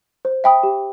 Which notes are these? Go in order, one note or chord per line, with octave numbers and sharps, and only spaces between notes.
C5
E5 G5 B5 D#6
G4